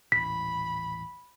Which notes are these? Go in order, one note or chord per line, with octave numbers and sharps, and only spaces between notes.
D#1 A1 B5 B6